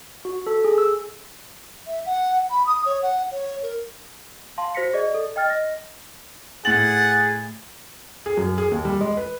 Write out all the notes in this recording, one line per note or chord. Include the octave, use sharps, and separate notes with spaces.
F#4
A4
G#4
E6
E5
F#5
B5
D#6
C#5
F#5
C#5
A#4
F5 A5 C6
F#4 C5 A#6 B6 C#7
G#4 D5 D#5
A4
D#5 G5 F6 A6
D#5 A#6
A2 G#4 F#5 A6 F#7
G#4
F#2
G#4
D#2
G3
G#3
B4